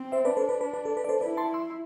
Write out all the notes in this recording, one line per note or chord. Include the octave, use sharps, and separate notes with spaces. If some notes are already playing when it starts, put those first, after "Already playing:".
Already playing: C4
C5 E5
D4 B4 D5
A4 C5
B4
B4
B4
A4
B4
D5
A4 C5
E4 B4 D5
A5 C6
C6 E6